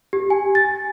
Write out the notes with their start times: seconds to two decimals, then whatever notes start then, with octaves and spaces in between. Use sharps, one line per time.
0.13 G4
0.30 G#5
0.55 A6